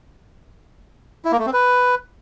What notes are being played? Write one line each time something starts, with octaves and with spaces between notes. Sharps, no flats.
E4
A#3
A3
C4
B4